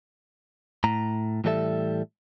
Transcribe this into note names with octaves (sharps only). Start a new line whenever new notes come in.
A2 A#5
A2 E3 G3 A4 E5